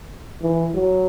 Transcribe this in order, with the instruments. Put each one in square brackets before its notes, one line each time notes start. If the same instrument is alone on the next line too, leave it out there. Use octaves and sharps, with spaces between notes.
[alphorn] E3
F#3